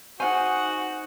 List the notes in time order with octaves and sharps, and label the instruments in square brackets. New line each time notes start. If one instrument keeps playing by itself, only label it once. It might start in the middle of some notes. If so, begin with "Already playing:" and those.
[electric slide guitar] D#4 G#4 C5 [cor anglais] F#4 [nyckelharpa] F#5 [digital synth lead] G#5